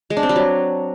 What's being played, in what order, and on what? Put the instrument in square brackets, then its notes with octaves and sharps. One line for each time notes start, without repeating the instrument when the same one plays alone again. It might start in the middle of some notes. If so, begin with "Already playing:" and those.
[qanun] G#3
D4
C4
G3
F#3